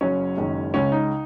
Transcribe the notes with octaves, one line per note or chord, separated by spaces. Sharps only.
F#1 F#2 F#3 C#4
F#1 F#2 D#3 G#3
C#2 C#3 G#3 C#4
D#4